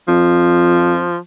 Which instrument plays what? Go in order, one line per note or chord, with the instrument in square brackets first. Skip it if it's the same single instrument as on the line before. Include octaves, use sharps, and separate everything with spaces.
[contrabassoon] F2 [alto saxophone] F3